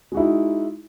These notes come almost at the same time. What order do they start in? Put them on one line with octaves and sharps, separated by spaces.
G#3 F#4 E4 D#4